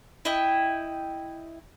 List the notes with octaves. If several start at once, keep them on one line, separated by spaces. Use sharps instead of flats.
E4 D#5 G5